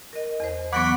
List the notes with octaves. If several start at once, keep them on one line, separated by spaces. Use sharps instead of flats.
A#4 D#5
E2 C5
E3 F#3 B3 F#5 B5 C#6 D6